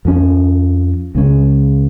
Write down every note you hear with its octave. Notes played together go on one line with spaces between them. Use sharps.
F2 F3 C#4
C#2 C#3 G#3 C#4